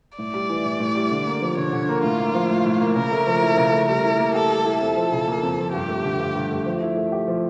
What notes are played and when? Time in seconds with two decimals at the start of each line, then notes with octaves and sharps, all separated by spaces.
0.18 A2 D5
0.34 G3
0.49 E3
0.65 A2
0.80 A2
0.95 G3
1.11 D3
1.27 A#3
1.42 F3
1.57 D3 C#5
1.73 D3
1.89 A#3
2.03 A2 F4
2.19 A#3
2.34 F3
2.50 A2
2.66 A2
2.81 A#3
2.96 C#3 A#4
3.12 A3
3.26 F3
3.42 E4
3.57 C#3
3.73 A3
3.88 G3 A#4
4.04 E4
4.19 A#3
4.35 G4 A4
4.50 G3
4.65 E4
4.81 F2 A4
4.96 F3
5.12 C#3
5.27 A#3
5.43 F2
5.58 F3
5.73 G2 G4
5.89 A3
6.04 D3
6.19 G2
6.35 G2
6.50 A3
6.66 F3
6.82 E4
6.97 A3
7.12 G4
7.28 F3